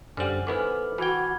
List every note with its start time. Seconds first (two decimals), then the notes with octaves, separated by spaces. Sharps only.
0.17 F#2 D3 G3 C5 F#5 G#5 F6 F#7
0.47 D#3 B3 E4 A4 B4 C5 D6 F6
0.98 E3 F#4 G5 G#5 B5 G#6